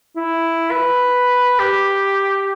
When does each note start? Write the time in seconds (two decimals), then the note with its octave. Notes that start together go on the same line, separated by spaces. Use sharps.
0.16 E4
0.71 B4
1.59 G4